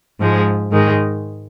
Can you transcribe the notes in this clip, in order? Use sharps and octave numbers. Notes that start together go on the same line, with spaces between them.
G#2 F3 G#3
G#2 D#3 G#3